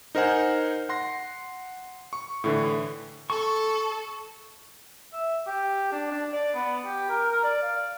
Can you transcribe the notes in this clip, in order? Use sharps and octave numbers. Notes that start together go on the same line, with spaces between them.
D#4 A#4 C5 F#5 G#5
F#5 C6 A#6
C#6
A2 D3 E3
A4 C#6
E5
G4
D4
D4
D5
B3
G4
A#4
A#4
D5
F5